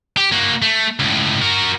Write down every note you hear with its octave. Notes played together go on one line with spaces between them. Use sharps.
G4
A#3 F#4
A3
C#2 A2
F#4 A#4